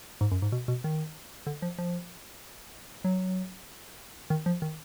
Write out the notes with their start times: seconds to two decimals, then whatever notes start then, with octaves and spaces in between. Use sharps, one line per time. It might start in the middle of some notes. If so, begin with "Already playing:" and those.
0.21 G#2
0.31 F#2
0.42 G#2
0.52 B2
0.68 B2
0.84 D#3
1.46 D3
1.62 F3
1.78 F3
3.04 F#3
4.30 D#3
4.46 F3
4.62 D#3